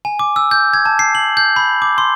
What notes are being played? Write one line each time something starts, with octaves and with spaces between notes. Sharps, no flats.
G#5
D6
E6
G6
G#6
A5
C7
F#7
G6
B5
D6
C6